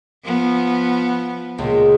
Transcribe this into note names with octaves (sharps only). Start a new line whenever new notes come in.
F3 B3
C#2 A#2